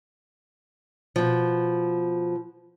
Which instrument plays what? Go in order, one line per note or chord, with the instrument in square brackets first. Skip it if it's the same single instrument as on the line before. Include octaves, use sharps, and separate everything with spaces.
[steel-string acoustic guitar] B2 F3